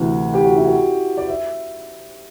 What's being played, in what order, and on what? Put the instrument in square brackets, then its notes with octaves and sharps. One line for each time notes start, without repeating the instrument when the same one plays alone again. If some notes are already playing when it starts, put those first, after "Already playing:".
Already playing: [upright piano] D2 C3 E3 [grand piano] E4
[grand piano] G4
F#4
E4
F#4
D5
E5